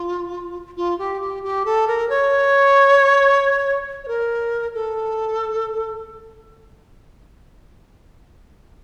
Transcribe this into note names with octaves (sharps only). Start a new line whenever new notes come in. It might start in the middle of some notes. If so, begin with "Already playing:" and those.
Already playing: F4
F4
G4
G4
G4
A4
A#4
C#5
C#5
A#4
A4